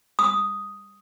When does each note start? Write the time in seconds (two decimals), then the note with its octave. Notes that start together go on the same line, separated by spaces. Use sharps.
0.19 D#6